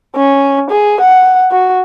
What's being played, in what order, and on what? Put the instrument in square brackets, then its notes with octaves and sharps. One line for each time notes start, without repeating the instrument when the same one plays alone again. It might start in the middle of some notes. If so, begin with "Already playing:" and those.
[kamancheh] C#4
G#4
F#5
F#4